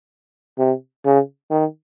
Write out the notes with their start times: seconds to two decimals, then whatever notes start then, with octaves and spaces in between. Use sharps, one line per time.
0.58 C3
1.05 C#3
1.50 D#3